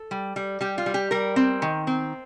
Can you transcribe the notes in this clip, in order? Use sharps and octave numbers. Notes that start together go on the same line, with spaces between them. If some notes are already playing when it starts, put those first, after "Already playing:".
Already playing: A4
G3
G3
G3 G4
F4
G3
G4
G3 A#4
C4
D#3
C4